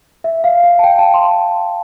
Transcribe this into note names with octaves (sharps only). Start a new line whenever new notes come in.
E5
F5
F5
A5
G5
A5
C6